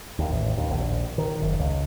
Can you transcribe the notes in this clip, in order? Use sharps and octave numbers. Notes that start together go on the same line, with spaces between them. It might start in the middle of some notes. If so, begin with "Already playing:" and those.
D#2
A1
D#2
A#1
D#3
F#1
C#2